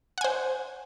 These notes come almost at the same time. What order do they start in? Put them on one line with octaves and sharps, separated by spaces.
F#5 G#5 C5